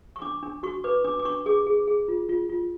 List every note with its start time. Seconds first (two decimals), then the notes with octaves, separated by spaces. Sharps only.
0.16 C#6
0.22 D4 D6
0.43 D4
0.63 F#4 C#6
0.84 B4 D6
1.04 D4 D6
1.19 D6
1.25 D4 C#6
1.46 G#4 D6
1.66 G#4
1.87 G#4
2.08 F4
2.29 F4
2.49 F4